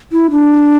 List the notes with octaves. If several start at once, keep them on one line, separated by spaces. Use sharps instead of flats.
E4
D4